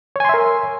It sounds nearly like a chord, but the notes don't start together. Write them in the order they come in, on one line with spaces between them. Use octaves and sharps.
C#5 G#5 C6 E5 A#4